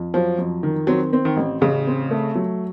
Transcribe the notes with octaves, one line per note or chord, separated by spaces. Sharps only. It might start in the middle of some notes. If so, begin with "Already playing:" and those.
Already playing: F2
F3 F#3
F2
D#3
F#3 C4
C4
D#3
A1
A1 C#3
C4
A3
F#3